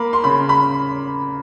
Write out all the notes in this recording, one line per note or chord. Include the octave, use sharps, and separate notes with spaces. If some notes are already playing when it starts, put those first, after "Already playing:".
Already playing: A#3 B5
C6
C#3 B5
B5